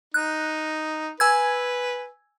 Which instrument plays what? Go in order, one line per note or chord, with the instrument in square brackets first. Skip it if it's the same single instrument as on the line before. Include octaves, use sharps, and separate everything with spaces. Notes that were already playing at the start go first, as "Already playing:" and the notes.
[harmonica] D#4 [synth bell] F#6
[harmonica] B4 [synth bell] G#5 E6 G#6